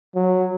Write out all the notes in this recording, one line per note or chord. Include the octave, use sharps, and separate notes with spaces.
F#3